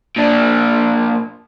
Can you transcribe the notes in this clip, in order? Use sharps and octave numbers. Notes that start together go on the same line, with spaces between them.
A#2 D4